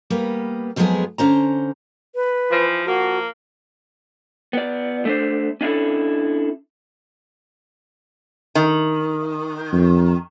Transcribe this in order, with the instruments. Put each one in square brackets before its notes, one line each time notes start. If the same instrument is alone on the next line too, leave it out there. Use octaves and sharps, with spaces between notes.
[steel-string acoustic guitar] G3 A#3 B3
F2 F3 F#3 G#3 B3 G#4
D3 C#4 C5 A#5
[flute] B4
[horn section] E3 F3
[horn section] F3 A#3 [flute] F#4
[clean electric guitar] B3 D5
A3 D4 C5
C#4 D4 E4 A4
[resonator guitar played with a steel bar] D#3
[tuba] F2